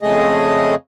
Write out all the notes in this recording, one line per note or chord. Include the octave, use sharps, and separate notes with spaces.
F2 C#3 G#3 A3 G#4 D#5